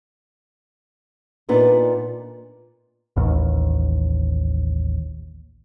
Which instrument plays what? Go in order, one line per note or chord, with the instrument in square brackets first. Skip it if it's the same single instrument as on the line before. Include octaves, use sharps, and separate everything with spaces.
[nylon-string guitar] A#2 B3 D4 D#4
[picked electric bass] A1 D#2